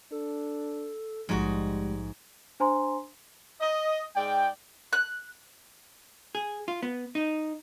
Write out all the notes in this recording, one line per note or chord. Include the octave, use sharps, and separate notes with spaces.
D4 A4
A#1 G#2 F3 G3 G#3 F#4
D4 C5 G#5 A#5 C6
D#5
G#2 G#3 D5 G5
F#6
G#4
F4
B3
D#4